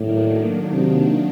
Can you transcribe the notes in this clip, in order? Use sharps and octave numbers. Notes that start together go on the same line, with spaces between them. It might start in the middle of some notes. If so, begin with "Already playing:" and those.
Already playing: A2 D#3 F#3 A#3 D4
C3